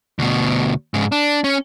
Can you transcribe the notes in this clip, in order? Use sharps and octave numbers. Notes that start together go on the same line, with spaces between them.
D2 B2
G#2 C#3
D4
C#4